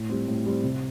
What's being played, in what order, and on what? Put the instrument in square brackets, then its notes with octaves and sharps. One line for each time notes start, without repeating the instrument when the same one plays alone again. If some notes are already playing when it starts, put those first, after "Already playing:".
Already playing: [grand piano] A2
G3 C4
A2
G3 C4
C3